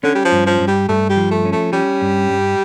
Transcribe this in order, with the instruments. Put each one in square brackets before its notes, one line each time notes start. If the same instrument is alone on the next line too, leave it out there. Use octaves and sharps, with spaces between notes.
[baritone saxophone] D3 [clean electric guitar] C#4
[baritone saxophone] G3
F3
[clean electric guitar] G2
[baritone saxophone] F3
[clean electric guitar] G2
[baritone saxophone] G3
[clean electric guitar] G2 [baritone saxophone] A3
[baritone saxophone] G3
[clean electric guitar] F3
[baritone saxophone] A3
[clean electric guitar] C#4
[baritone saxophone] A3
[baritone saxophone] G3 [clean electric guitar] C#4
[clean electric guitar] G2
G2